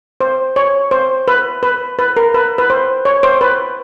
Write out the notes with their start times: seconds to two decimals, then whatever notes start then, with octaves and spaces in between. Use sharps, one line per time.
0.21 C5
0.56 C#5
0.91 C5
1.28 B4
1.63 B4
1.99 B4
2.17 A#4
2.34 B4
2.58 B4
2.70 C5
3.05 C#5
3.23 C5
3.41 B4